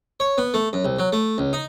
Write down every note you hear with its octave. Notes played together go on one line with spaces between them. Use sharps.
C#5
B3
A3
F#2
C2
F#3
A3
C#2
D#4